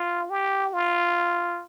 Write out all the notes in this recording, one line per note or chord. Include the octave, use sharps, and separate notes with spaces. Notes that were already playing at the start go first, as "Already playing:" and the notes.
Already playing: F4
G4
F4